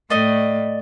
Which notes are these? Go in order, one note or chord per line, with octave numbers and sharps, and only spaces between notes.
A2 A3 D5 D#5